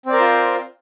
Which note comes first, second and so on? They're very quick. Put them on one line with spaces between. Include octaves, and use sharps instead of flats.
C4 D5 A#4 C5 F4